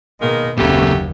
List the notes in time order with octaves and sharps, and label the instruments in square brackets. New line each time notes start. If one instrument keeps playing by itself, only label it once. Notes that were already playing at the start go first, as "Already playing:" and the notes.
[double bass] B2 [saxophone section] D#3 G#3 A#3
[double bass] F#1 D#2 [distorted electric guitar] A#2 C#3 [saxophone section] F#3 A3 G4